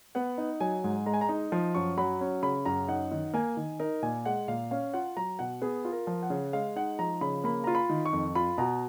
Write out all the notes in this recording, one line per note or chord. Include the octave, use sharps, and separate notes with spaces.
B3 F#5
D#4
F#3 G#5
G#2
G#3 A#5
G#5
A#5
D#4
F3
F#2 C#6
F#3 B5
C#4
C#3 B5
F#2 A#5
D#4 F#5
D#3
A#3 G#5
D#3
D#4 A#4
A#2 G#5
G#3 F#5
A#2 F5
C#4 F5
F4 F#5
F#3 A#5
B2 F#5
B3 G#4
F4
A#4
F3
F#5
C#3
G#3 F5
D#4 F#5
F3 A#5
C#3 B5
A#3 B5
F4 A#5
B5
D#3
C#6
F2
F4 B5
B2 A#5